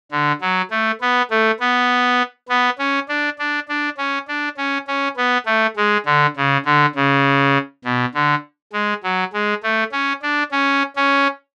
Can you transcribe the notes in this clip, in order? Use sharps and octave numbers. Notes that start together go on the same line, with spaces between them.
D3
F#3
A3
B3
A3
B3
B3
C#4
D4
D4
D4
C#4
D4
C#4
C#4
B3
A3
G#3
D3
C#3
D3
C#3
B2
D3
G#3
F#3
G#3
A3
C#4
D4
C#4
C#4